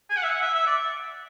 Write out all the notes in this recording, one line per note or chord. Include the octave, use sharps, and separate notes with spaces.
G#5
F#5
E5
F#5
E5
E5
D5